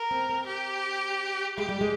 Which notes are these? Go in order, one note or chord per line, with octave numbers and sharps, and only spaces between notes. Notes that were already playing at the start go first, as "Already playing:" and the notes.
Already playing: A#4
C4
C4
G4
G#3 G4
G3
G#3